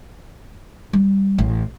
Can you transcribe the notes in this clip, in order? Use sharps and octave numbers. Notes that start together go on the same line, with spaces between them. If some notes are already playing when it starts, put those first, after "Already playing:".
G3
A1